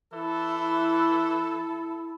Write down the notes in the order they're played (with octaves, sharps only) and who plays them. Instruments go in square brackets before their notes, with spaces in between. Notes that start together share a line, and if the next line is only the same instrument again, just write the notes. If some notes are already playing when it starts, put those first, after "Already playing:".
[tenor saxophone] E3 [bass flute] E4 [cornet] A4